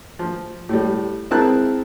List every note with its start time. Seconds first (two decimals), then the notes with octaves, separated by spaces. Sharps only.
0.19 F3
0.69 A2 G3
1.31 G#3 C4 E4 A#4 A5 F#6